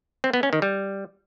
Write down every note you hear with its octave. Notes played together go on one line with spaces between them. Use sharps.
C4
B3
C#4
D#3
G3